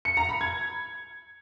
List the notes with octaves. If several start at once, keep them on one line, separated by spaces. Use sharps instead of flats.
C#7
A#5
B5
G#6